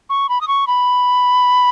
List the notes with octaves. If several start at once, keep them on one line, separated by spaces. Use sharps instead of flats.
C#6
B5
D#6
C#6
B5